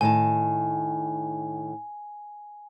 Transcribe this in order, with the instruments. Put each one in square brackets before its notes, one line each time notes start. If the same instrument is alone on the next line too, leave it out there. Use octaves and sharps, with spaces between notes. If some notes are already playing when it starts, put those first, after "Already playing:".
[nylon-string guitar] A2 D#3 A5 [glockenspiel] G#5